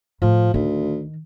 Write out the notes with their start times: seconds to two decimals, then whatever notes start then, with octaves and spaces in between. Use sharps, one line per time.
0.22 A2 F3
0.54 D2 D#3